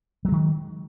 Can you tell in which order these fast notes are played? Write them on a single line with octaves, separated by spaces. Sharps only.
F#3 G#3 D#3